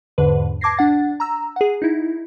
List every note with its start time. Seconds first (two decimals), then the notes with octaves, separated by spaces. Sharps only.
0.18 E2 G#2 D3 B4
0.61 A5 D6 G#6 A#6 C7
0.77 D4 F#5 A6
1.20 A#5 E6
1.56 G#4 F#5
1.82 D#4 E4